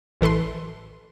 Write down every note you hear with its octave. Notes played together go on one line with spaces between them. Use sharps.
A1 E3 A4 B4 C6